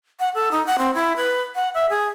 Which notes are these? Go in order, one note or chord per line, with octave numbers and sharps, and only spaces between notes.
F#5
A4
D#4
F#5
C4
E4
B4
F#5
E5
G#4